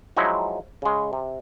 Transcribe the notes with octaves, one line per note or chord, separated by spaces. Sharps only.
F3 F#3 G#3 D#4 E4
C#3 G#3
C3